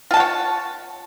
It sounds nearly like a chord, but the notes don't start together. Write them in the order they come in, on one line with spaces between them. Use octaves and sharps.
F4 A5 F#5 C#5